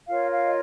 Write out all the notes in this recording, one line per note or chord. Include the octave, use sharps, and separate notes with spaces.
F4 A#4 C#5 F5
F5
D#5